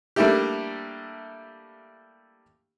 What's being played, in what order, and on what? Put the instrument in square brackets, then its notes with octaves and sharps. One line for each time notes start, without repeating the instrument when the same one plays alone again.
[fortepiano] G3 A3 A#3 D4 E4 G4